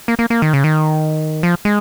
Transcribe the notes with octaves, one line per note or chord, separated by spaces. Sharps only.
A#3
A#3
A#3
D#3
C#3
D#3
F3
G#3